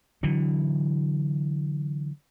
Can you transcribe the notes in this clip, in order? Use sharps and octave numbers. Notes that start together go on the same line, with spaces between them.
D3 E3 F#3